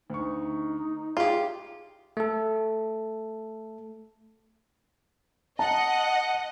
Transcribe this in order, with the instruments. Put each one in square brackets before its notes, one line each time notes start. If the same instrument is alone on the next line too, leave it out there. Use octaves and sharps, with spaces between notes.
[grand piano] D2 C#6 [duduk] D#4
[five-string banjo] F4 G4 [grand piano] G#4
[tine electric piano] A3 A4
[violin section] D#5 F#5 [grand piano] A5